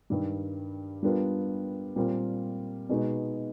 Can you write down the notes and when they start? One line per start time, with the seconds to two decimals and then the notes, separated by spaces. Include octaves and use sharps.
0.10 G2 D#3 G3
1.03 G3 B3 D4 F4 A#4
1.96 A#2 G3 C4 F4 A#4
2.89 B2 G#3 B3 D#4 F#4